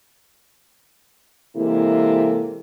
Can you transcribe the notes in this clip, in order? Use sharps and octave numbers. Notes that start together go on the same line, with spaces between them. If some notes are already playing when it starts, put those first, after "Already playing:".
C3 E3 G#3 A#3 E4 A4